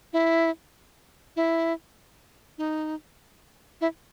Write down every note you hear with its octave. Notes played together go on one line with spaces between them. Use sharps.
E4
E4
D#4
E4